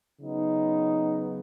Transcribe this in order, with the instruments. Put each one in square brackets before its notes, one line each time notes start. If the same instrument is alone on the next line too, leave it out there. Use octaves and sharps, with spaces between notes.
[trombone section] C#3 F#3 B3 D#4